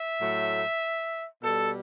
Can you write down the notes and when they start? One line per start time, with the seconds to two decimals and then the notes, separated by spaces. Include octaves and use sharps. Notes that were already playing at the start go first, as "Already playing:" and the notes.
Already playing: E5
0.20 A2 F#3 A3
1.42 B2 G3 A4